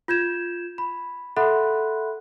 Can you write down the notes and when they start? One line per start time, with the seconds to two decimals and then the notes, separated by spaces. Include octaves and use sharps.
0.08 F4 G6 G#6 E7
0.78 B5
1.37 A4 E5 F#5 B5 C6 F#6